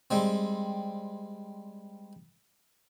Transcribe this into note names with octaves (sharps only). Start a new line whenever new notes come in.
G3 G#3 C4